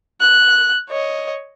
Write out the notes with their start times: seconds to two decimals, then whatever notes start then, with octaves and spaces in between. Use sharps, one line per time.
0.21 F#6
0.89 C#5 D#5